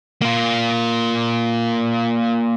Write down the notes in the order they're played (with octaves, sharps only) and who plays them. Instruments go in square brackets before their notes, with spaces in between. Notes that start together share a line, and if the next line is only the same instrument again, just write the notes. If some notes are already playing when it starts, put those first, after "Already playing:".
[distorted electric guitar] A#3 F4